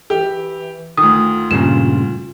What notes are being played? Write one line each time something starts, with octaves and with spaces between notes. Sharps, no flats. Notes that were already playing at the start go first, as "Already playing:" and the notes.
E3 G4
D2 D#3 F4 D#6
G2 A#2 C#3 E7